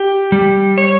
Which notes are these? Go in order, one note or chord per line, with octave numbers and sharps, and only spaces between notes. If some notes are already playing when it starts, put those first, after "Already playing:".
Already playing: G4
G3
C#5